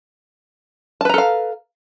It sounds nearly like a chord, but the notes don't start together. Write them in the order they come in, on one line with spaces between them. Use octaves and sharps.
A5 B4 A#5 A4 F5